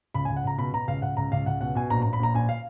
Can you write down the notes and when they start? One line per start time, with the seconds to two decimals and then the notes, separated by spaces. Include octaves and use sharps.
0.14 C#2 B5
0.25 G#5
0.29 C#2
0.36 F#5
0.45 C#2 A#5
0.58 B2 B5
0.73 B2 A#5
0.88 C#2 F5
1.02 C#2 F#5
1.17 C#2 A#5
1.32 C#2 F5
1.46 C#2 F#5
1.61 B2 F#5
1.75 B2 G#5
1.90 A#1 A#5
2.02 A#5
2.05 A#1
2.13 B5
2.19 A#1 A#5
2.34 A#1 G#5
2.49 F5